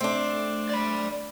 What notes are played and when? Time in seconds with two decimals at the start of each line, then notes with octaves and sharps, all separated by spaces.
0.01 A3 C4 D4
0.69 D5 B5